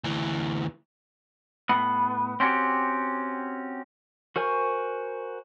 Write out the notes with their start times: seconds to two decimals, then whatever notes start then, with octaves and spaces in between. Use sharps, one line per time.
0.04 D2 E3
1.69 A2 B3
2.40 C4 C#4 F#4 G4
4.36 F#4 A#4 C5 G#5 C#6